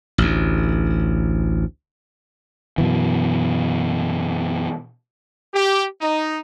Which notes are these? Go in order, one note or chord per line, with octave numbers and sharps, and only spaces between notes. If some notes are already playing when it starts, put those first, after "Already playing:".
A1 D2
F#2 B2 E3
G4
D#4